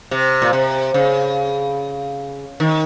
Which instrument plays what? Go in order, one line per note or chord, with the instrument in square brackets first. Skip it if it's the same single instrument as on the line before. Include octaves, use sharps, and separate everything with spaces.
[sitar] C3
A#2
C3
C#3
D#3